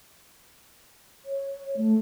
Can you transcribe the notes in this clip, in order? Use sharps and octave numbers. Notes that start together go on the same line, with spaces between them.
C#5
A3